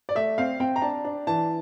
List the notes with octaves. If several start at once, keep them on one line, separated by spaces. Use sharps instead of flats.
D5
A3 E5
C4 F5
C4 G5
A#5
D4 A5
D4
E3 A5